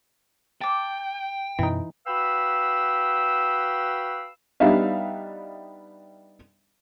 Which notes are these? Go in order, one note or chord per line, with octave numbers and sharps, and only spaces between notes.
G5 A5 D6
F#2 B2 E3 B3 D#4
F#4 B4 F5 G5 B5 E6
G3 B3 D4 D#4 E5 F5